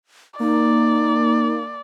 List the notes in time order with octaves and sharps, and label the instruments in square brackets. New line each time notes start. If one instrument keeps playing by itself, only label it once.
[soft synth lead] A#3 [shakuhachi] D#4 [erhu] D5